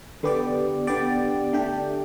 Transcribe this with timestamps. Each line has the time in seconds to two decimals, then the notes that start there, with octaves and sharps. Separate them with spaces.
0.23 D3 B3 G4 D5
0.87 D3 B3 G4 D5
1.53 D3 A3 D4 G4